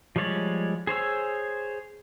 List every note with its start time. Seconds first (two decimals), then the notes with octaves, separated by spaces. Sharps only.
0.16 F3 G3 G#3 C#5 D5
0.87 G#4 C5 C#5 E6